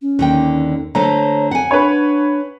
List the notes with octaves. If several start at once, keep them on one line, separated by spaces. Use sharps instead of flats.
C#4
D#2 D3 G5
D3 A3 C5 C#5 A#5
C4 F#5 G#5
D4 B4 C#5